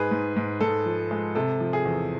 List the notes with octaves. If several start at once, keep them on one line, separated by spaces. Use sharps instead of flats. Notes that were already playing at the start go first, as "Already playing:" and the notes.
Already playing: G#2 G#4 B4
G#2
G#2
G#2 A4
F3
G#3
C3 A4
F3
G#4
E2